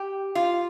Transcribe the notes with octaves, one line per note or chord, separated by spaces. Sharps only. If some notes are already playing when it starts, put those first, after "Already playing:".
Already playing: G4
F4